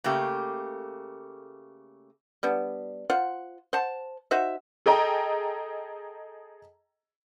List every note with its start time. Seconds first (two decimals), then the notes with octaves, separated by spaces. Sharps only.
0.04 C#3 A3 A#3 G4
2.43 G3 B3 D4
3.10 F4 C5 F#5
3.73 C5 F#5 A5
4.31 D#4 F#4 C5 E5
4.86 G#4 A4 D#5 G5 A#5